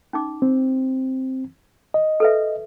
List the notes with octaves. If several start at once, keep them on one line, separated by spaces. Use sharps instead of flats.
C#4 D#4 D6
C4
D#5
A4 B4 E5